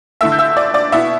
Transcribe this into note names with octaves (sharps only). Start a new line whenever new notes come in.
D3 A3 E4 E5 E6
G6
E5 E6
D5 D6
D5 D6
B2 B3 E4 E5